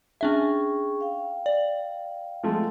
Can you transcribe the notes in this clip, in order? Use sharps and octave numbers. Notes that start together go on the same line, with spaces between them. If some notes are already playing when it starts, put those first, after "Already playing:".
C#4 D4 G#4 E5 G5 C#6
F5 G5
D5
F3 G#3 A3